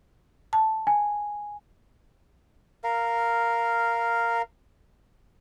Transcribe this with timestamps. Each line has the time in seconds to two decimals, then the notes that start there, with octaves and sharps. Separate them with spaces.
0.53 A5
0.87 G#5
2.84 A#4 F5